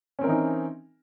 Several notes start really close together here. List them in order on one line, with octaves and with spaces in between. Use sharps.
C#4 C4 A#4 E3 D#4